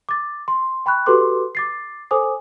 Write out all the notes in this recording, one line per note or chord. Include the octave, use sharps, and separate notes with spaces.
D6 A6
C6
G5 B5 C#6 F#6
F#4 G4 A4 B4 C6 D6
D6 A6 C7
A4 C5 G#5 D6 D#6